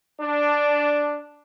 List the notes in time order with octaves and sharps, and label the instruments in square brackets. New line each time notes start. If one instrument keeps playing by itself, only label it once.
[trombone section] D4